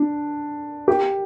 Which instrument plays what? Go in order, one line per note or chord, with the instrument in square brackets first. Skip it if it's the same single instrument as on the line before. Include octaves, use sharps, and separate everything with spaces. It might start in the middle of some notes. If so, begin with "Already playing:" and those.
Already playing: [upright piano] D4
G4